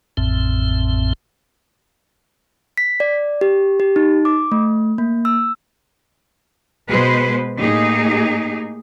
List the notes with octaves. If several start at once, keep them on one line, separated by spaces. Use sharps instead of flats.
A1 F2 A2 C4
B6
D5
G4
G4
D#4
D6
A3
A#3
E6
B2 G#3 B4 C5
A2 A#3 D#4 G4 G#4